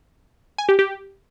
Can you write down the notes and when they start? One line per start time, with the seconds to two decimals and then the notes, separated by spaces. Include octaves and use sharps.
0.58 G#5
0.69 G4
0.79 G4